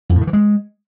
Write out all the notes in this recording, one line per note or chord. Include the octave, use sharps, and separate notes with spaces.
F2
A2
D#3
E3
G#3